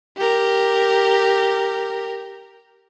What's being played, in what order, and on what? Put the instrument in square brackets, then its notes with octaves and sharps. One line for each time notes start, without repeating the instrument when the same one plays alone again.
[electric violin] G4 A#4